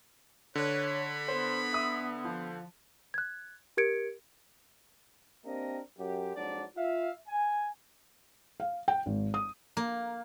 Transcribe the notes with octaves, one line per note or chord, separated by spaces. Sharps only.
D3 B4 C#5
B5
B3 C5
E5 D#6 E6
F3 C5
F#6 G#6
G4 A#4 G#6 C#7 D7
A#3 C4 D4 G4 A#4 D#5
F#2 G4
F2 G#2 F#3 D4 D5
F4 E5 F5
G#5
F5
G5
G#1
D#6
A#3